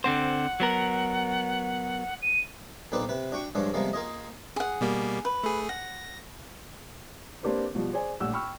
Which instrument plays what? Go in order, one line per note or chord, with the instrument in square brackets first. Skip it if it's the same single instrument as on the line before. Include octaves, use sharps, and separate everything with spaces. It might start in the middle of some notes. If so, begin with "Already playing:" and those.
[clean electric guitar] D3 C4 C5 [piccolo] F#5
[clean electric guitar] F#3 B3 A#4
[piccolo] D#7
[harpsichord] B1 A#2 C4 D#4 B4 D5
C3 B4
D4 F#4 G5 C#6
G2 F3 G#3 C#4 D4
C3 F3 G3 G#3 A#3 B3
A#3 F4 G#4 D#5
[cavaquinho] G#4 F#5
[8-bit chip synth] B2 G3 A#3
[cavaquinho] B4
[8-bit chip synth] A3 G#4
[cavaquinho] F#5 [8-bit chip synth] A#6
[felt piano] A#3 C4 D4 G4 A#4 B4
B2 F3 G3
G#4 C5 D5 G#5
A#1 A2 G3 G4 F#5 E6
G5 B5 C#6 E6 F6